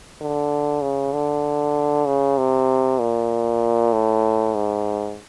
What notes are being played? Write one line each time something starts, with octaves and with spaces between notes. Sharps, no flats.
D3
C#3
D3
C#3
C3
A#2
A2
G#2